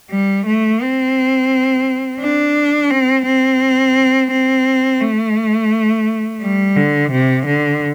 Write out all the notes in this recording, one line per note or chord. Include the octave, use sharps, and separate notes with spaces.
G3
A3
C4
D4
C4
C4
C4
A3
G3
D3
C3
D3